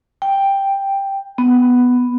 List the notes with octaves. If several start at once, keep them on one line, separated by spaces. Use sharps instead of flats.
G5
B3